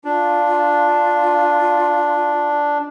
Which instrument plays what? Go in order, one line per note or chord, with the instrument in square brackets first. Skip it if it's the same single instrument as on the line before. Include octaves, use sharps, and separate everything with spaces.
[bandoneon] D4 [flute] F4